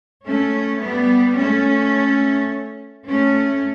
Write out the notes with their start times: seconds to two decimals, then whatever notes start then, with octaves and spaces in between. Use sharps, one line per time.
0.26 A3 C#4
0.83 G3 B3
1.39 A3 C#4
3.08 A3 C#4